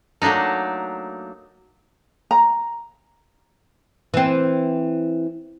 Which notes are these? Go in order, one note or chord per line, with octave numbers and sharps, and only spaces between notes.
F#3 A3 A#3 D4 D#4
A#5
E3 C4